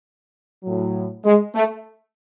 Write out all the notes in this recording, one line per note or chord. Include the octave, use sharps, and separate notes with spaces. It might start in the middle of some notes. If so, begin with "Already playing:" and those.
A2 F#3
G#3
A3